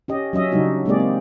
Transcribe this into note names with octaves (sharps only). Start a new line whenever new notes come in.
C#4 G4 D#5
F#3 C#4 D#5 E5
C#3 F#3 G3 D4 D#4 F#4
G#3 A#3 C4 G4 G#4 D5
C4